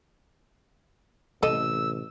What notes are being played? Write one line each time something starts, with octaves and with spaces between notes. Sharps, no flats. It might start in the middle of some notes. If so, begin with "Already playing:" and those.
A1 C3 A4 D#5 E6